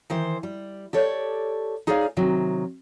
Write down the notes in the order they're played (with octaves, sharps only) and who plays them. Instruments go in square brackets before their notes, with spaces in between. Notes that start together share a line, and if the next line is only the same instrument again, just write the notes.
[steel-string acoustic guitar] D#3 E3 C5
G3
G4 A4 C#5 D5
D#4 G#4 C#5 D5 E5 F5
C3 D#3 F#3